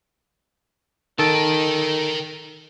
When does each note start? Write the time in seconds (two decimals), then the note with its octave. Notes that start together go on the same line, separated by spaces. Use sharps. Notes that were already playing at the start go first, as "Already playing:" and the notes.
1.19 D#3 A4 A#4 G5